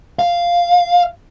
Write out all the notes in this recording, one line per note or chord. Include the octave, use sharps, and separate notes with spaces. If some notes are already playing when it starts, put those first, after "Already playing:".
F5